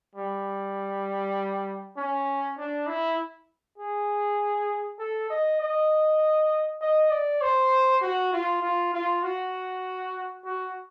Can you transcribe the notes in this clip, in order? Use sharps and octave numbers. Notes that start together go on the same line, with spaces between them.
G3
C#4
D4
E4
G#4
A4
D#5
D#5
D#5
D5
C5
F#4
F4
F4
F4
F#4
F#4